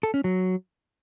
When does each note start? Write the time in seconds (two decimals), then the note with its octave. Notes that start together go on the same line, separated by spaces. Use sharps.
0.03 A4
0.14 C#4
0.24 F#3